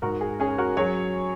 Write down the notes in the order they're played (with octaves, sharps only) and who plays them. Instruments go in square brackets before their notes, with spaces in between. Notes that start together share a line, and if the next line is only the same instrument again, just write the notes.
[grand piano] G#2 F#4 A#4
G#4
C#4 G#4
F#4 A#4
F#3 G#4 C#5